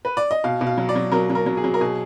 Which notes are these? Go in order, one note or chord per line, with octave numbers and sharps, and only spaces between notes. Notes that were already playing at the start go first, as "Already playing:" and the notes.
B4
D5
D#5
B2 F5
B2
F5
F#3
D5
F#3
F#3 A#4
F#3
A#4
F#3
G#4
F#3
A#4
B2 G#4